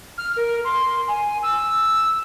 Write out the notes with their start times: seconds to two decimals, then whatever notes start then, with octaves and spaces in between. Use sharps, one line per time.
0.18 F6
0.37 A#4
0.65 C6
1.08 G#5
1.43 E6